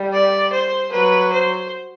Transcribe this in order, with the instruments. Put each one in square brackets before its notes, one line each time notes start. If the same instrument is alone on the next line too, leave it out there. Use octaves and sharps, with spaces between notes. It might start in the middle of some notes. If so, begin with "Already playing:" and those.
Already playing: [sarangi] G3
[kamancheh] D5
C5
[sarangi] F#3 [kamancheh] B4
[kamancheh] C5